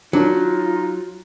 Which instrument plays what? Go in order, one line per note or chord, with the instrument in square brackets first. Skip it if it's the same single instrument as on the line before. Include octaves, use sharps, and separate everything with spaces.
[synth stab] D#3 D4 [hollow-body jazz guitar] F#3 [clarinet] D#4 [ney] F4